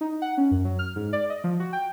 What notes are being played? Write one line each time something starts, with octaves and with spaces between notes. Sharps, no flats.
D#4
F#5
C#4
F#2
F#3
F6
G#2
D5
D#5
F3
F#4
G5